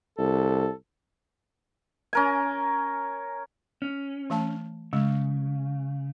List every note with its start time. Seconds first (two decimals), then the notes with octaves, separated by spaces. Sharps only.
0.18 C2 A4
2.13 C#4 A#4 G#5
3.82 C#4
4.30 E3 A3 A5
4.93 C#3 G#3